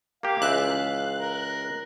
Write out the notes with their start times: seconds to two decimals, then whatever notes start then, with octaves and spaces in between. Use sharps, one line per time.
0.23 A#3 G4 F5
0.42 C#2 E3 E5 F#6
1.19 A#4